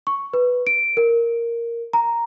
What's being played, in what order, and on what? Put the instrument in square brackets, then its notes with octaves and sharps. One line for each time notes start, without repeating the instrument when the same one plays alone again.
[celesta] C#6
B4
D7
A#4
A#5